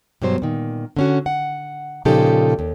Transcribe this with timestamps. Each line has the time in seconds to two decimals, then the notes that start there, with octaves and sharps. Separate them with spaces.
0.22 G2 B2 F#3 C5
0.42 A#2 D#3
0.96 D3 C#4 F#4
1.26 F#5
2.05 A#2 C#3 F3 D#4 G4 A4
2.59 D#2